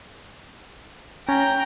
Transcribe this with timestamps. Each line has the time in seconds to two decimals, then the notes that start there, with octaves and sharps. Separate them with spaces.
1.28 C#4 G5 A#5